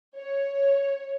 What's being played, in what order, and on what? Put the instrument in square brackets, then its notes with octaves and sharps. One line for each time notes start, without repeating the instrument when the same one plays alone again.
[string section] C#5